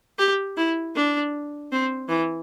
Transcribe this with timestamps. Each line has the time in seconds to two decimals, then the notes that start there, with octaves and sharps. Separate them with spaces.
0.19 G4
0.57 E4
0.95 D4
1.72 C4
2.09 E3